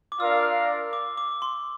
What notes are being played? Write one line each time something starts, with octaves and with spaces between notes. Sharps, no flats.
D6
D4 F4 A#4 D5 F5 E6
D6
D6
C6